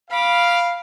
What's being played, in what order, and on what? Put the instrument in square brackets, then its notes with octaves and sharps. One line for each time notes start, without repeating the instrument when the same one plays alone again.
[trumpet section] F5 [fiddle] B5 D6